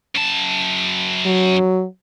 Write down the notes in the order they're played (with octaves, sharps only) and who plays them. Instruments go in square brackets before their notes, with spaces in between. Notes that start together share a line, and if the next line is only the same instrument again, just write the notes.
[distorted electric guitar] F#2 A5
[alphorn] F#3